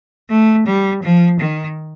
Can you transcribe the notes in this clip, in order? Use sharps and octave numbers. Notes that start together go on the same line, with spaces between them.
A3
G3
F3
D#3